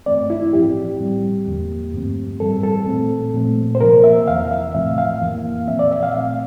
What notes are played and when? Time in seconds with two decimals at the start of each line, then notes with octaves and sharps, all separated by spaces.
0.06 G2 E3 A3 C4 D5
0.30 E4
0.53 A2 F3 C4 G4
1.00 A2 G3 C4
1.47 E2 D3 F3 A#3
1.93 G2 F3 A3 C4
2.40 A2 E3 G3 C4 A4
2.63 A4
2.87 A#2 A3 C4
3.34 A#2 F3 A3 C4
3.75 C5
3.81 C3 F3 A#3 A#4
4.04 E5
4.27 E2 C3 E3 F5
4.51 E5
4.74 A2 F3 A3 C4 E5
4.98 F5
5.21 F2 E3 A#3
5.67 A#2 F3 C4 E5
5.79 D5
5.91 E5
6.03 F5
6.14 A#2 A3 C4 F5